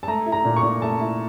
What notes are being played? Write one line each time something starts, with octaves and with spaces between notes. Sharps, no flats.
A5
A3 A#5
E4
A#5
A#2
C#6
A#2
A3 A5
E4